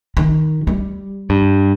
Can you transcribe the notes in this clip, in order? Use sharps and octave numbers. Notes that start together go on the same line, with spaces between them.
D#3
G3
G2